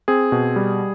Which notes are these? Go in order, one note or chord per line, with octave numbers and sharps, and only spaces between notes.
C4 G#4
B2
G3